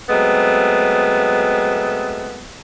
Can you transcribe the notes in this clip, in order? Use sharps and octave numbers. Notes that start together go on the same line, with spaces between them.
F#3 G#3 A3 B3 C4